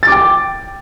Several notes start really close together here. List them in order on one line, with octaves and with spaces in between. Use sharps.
A6 D6 G5